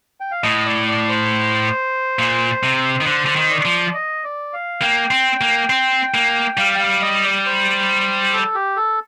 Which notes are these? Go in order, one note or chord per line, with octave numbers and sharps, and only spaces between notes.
G5
F5
A2 D#5
D5
D5
C5
A#2
C3
D#3
D3 C5
D3
D#3
D5
F3
D#5
D5
F5
A#3 G5
C4
A#3
C4
A#3
G3 F5
G5
F5
D#5
D5
C5
A4
G4
A4